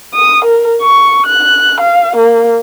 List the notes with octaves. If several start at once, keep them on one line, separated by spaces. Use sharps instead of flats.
D#6
A#4
C#6
F#6
F5
A#3